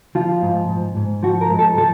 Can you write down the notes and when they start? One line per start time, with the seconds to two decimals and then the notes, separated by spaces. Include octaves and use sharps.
0.15 F3 F4
0.42 G#2
0.69 G#2
0.97 G#2
1.23 F3 F#4
1.41 A#4
1.50 G#2
1.59 A4
1.78 F3 A4